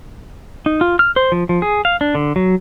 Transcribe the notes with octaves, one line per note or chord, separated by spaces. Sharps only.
D#4
F4
F6
C5
F3
F3
G#4
F5
D4
D3
F#3